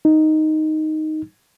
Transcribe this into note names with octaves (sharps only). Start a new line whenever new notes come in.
D#4